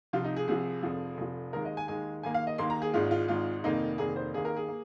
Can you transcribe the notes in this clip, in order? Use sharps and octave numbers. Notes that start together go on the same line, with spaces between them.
C2 C3 F3 F4
D#4
G#4
C2 C3 F3 G#4
F1 F2 F3
F1 F2 F3
D#2 D#3 G#3 A#4
D#5
G#5
D#2 D#3 G#3 G#5
D#2 D#3 A#3 G#5
F5
D#5
D#2 D#3 A#3 C6
A#5
G#4
G#1 G#2 G#3 F4
F4
G#1 G#2 G#3 F4
F1 F2 D#3 A#3 D#4
F1 F2 D#3 A#3 G#4
C5
D#2 D#3 A#3 G#4
A#4
G#4
A#3